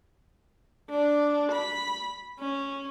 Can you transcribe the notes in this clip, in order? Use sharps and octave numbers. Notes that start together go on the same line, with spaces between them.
D4
B5
C#4